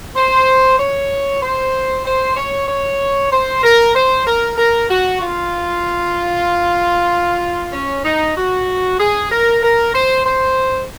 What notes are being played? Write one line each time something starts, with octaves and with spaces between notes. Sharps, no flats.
C5
C#5
C5
C5
C#5
C#5
C5
A#4
C5
A#4
A#4
F#4
F4
C#4
D#4
F#4
G#4
A#4
A#4
C5
C5